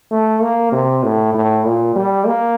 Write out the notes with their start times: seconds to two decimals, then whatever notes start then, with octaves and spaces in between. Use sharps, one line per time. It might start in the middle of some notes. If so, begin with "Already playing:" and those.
0.11 A3
0.42 A#3
0.72 C3
1.03 A2
1.34 A2
1.65 A#2
1.96 G3
2.26 A#3